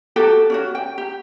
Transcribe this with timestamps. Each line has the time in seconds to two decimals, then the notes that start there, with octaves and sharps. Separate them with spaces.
0.16 F#4 G4 A4
0.50 C#4 E4 F#4
0.75 G5
0.98 G4